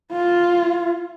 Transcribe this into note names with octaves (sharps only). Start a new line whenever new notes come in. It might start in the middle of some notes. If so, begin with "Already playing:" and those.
F4